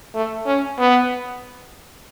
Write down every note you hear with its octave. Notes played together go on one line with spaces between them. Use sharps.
A3
C#4
B3